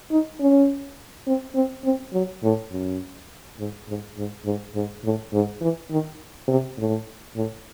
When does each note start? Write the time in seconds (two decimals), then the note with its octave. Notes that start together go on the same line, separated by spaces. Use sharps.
0.11 D#4
0.40 C#4
1.27 C4
1.55 C4
1.84 C4
2.13 F#3
2.43 A2
2.71 F#2
3.59 G#2
3.88 G#2
4.17 G#2
4.45 G#2
4.75 G#2
5.04 A2
5.33 G#2
5.61 E3
5.91 D#3
6.48 C3
6.77 A2
7.36 A2